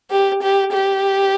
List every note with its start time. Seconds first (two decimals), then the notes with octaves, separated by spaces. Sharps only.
0.10 G4
0.42 G4
0.72 G4